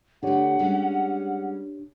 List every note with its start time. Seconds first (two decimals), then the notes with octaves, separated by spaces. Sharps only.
0.23 D3 A3 D4 G4 C#5 F#5
0.59 G3 G#3 C#4